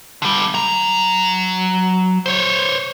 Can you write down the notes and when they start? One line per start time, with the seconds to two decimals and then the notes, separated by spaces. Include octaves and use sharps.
0.22 D3 G3
0.54 F#3 A#5
2.26 C5 C#5